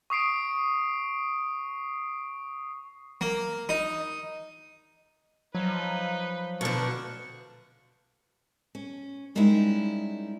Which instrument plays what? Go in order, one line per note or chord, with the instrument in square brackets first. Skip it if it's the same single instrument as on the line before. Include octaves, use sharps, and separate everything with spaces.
[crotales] C#6 D#6 C7 D7
[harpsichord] A#3
D#4
[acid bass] F3 [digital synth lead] F#3 [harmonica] D#4 B4
[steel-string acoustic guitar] B2 D3 [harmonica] D#3 D4 C#6
[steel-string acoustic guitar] C#4
G3 G#3 A#3 C#4 D#4 E4